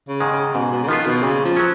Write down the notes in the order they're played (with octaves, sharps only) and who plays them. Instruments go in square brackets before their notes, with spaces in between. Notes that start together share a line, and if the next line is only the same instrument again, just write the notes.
[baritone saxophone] C#3
[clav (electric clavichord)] G#2 D#3 G#3
[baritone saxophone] C#3
[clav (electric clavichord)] G#2 [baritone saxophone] B2
[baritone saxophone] B2
C#3
[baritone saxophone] D#3 [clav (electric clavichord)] F3 B3 F4
[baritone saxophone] B2
[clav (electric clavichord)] A#2 [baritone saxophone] C#3
[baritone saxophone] F3
[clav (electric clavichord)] F#3 C#4